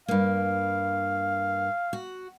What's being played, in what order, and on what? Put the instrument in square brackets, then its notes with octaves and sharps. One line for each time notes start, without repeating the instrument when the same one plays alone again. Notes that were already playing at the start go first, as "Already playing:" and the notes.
[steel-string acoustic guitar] G2 A#3 [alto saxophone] F5
[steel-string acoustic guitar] F#4